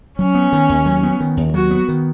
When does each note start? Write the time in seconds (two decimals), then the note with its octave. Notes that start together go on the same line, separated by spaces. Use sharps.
0.18 F#3 C#4
0.35 B3
0.53 D#3
0.69 D#2
0.86 F#3
1.03 B3
1.20 D#3
1.37 D#2
1.54 F#3 F#4
1.71 B3
1.89 D#3